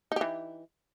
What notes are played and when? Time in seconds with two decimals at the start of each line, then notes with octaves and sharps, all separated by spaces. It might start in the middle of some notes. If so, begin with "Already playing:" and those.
0.12 D#4
0.16 G4
0.21 E3